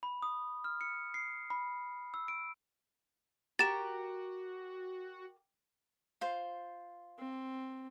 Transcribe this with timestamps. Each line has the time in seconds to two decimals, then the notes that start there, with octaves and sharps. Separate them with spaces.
0.03 B5
0.22 D#6
0.64 F6
0.81 C#7
1.14 C7
1.50 B5
2.14 E6
2.28 D7
3.59 F#4 G4 A#4 A6 E7
6.21 F4 C5
7.19 C4